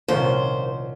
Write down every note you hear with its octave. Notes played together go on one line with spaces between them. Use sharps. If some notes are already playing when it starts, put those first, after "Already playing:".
C2 A#2 D#3 F3 C#4 C5